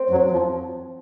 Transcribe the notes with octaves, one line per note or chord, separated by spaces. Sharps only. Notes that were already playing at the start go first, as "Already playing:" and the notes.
Already playing: C4
F#2 F#3
F2 F3